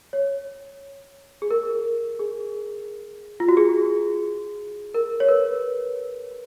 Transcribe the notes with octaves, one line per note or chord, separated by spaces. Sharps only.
C#5
G#4
A#4
G#4
F4
F#4
G#4
A#4
C#5
B4